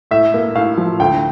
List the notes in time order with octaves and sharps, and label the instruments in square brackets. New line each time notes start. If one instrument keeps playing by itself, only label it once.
[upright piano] A2 E5
A#3
A2 F5
F3
D2 G5